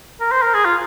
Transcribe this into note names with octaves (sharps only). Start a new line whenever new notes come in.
A#4
C5
A#4
G#4
F4